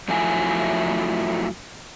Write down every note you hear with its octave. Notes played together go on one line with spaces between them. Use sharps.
F2 F3 F#3 A3 E4 G#5